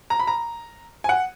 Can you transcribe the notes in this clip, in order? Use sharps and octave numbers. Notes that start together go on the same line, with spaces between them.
A#5
B5
A#5
G#5
F#5